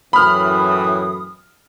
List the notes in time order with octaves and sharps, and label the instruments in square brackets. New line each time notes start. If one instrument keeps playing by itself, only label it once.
[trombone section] F#2 A2 E3 [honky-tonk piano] B5 F6 [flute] D#6